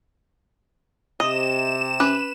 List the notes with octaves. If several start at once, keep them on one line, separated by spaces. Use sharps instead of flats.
C3 D#5 D#6 E7
C#4 B4 D6